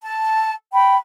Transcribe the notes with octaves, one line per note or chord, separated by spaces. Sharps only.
A5
G5 B5